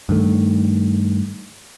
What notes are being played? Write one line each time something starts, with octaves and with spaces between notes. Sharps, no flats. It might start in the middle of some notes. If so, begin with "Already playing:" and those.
G2 D#3 A3